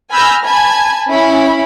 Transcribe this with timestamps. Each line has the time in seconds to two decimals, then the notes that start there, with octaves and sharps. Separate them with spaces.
0.11 G#5 B5 E6 F6 G6 A#6
0.45 G#5 A5 B5 G#6
1.11 C#4 E4 B5